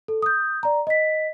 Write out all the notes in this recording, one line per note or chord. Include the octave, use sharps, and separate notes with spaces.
A4
D#6 G6
D5 A#5
D#5 B6